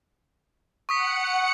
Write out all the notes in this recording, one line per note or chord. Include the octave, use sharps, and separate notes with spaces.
F#5 C#6 D#6 B6 C#7